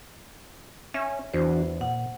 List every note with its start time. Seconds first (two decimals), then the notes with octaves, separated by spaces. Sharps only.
0.94 C#4 E5
1.34 E2 E3 D4 F#4 C5
1.81 A#2 F#5